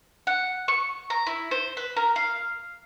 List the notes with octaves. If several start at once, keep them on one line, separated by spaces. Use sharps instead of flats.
F#5
C#6
A#5
E4
C5
B4
A#4
F5